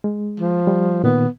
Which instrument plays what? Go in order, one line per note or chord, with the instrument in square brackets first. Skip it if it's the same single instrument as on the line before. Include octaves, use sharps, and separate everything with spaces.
[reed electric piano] G#3
[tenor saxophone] F3
[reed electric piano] G3
[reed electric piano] A#2 D#3 [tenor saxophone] B3